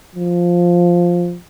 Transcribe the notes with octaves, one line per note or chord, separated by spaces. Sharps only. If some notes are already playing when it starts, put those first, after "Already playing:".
F3